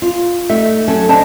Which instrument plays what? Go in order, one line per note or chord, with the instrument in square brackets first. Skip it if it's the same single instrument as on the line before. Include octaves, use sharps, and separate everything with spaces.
[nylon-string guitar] F4
[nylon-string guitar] A3 D#4 [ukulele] E5
[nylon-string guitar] F#3 C#4 A4
[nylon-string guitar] D3 D4 [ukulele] C5 D#5 A5